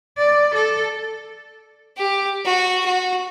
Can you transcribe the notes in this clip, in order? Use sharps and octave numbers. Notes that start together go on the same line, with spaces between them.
D5
A4
G4
F#4
F#4